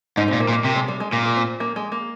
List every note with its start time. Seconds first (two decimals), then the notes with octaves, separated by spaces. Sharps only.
0.17 G#2 D#4
0.28 A#2 C4
0.40 A#3
0.49 A#2
0.53 A#3
0.64 C3 A#3
0.76 G#3
0.88 G3
1.00 G#3
1.12 A#2 A#3
1.25 A#3
1.36 C4
1.60 A#3
1.76 G#3
1.92 A#3